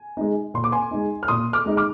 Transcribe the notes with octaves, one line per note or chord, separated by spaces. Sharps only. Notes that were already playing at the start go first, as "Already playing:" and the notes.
Already playing: G#5
G#3 D#4
A#2 C6
D6
G#5 C6
G#3 D#4
F6
A#2 C6 D#6
D6 F6
G#3 D#4
D6 F6